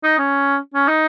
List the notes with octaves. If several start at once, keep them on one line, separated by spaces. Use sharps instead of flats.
D#4
C#4
C#4
D#4